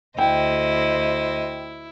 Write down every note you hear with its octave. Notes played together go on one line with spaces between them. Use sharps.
D2 E4 C5 D#5 G5